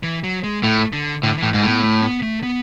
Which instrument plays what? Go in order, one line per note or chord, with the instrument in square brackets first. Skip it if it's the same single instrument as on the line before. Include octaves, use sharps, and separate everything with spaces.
[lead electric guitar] E3
F#3
G#3
[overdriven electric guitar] A2 [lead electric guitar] A3
[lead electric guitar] D3
[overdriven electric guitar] A2 [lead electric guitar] D3
[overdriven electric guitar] A2 [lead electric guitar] E3
[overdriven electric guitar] G#2 [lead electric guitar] G#3
[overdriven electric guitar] A2 [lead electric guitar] B3
[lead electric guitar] A3
B3
A3
B3